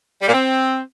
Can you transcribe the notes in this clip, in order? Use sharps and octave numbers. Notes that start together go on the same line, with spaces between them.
G3
A#2
C4